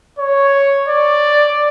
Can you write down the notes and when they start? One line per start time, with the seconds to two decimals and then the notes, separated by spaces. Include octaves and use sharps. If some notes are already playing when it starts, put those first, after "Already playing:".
0.19 C#5
0.88 D5